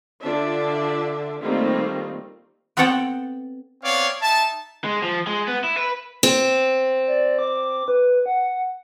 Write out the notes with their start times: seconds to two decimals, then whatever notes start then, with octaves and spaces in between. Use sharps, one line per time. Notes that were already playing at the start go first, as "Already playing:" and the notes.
0.21 D3 D4 F4 D5 E5
1.42 D#3 G3 A3 A#3 C4 F4
2.77 B3 C4 A4 C#5 F#5 G5
3.83 B3 C4 C#5 D5 F5
4.22 D#4 E5 A5
4.84 G#3
5.03 F3
5.27 G#3
5.48 B3
5.64 E4
5.77 B4
6.23 C4
7.07 D5
7.39 D6
7.88 B4
8.26 F#5